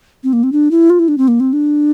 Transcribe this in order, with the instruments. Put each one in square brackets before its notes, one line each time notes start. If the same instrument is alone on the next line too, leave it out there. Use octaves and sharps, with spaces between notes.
[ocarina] C4
A#3
C4
D4
E4
F4
E4
D4
C4
A#3
C4
D4